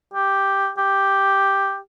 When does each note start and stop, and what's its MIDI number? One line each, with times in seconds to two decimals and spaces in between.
0.14 0.69 67
0.78 1.78 67